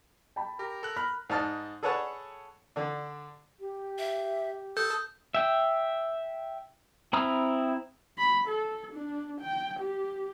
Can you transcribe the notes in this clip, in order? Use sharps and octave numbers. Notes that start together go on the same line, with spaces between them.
G5 A5 B5
G4 A#4
A4 F#6
B5 F6
G#2 D#4 A5 F6
G#4 A4 B4 C#5 F#5 A5
D3 D4
G4
E5
A4 D#6 G6
E5 G5
C4 E4 A#5 D#6 F6
B5
A4
D4
G5
G4